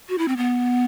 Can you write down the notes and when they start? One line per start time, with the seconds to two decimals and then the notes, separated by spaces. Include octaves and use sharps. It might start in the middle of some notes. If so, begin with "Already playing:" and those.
0.09 F#4
0.18 E4
0.28 C4
0.37 B3